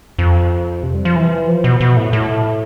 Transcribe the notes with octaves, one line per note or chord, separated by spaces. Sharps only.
F2
C3
G3
F3
E3
F3
B2
B2
A2
A2